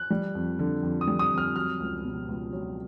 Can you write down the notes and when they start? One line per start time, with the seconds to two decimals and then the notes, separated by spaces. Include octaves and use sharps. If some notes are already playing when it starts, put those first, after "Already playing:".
Already playing: F#6
0.10 G3
0.35 F2
0.59 D3
0.83 F2
1.01 D#6
1.07 G3
1.19 D#6
1.32 F2
1.38 F6
1.56 F#3 F6
1.80 C#2
2.04 B2
2.29 C#2
2.53 F#3